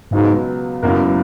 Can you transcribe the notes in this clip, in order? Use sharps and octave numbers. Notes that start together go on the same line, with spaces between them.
C#2 G#2 B2 F#3 B3
C#2 F#2 B2 A#3 E4 A#4